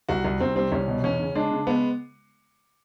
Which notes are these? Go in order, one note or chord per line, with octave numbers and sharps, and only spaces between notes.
C2 F#4
C2
C2 C4
G3 C4
C2 C#4
B2
E2 C#4
C#3
G#3 D4
C#3
G#3 B3